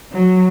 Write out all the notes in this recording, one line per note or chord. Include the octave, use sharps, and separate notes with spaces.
F#3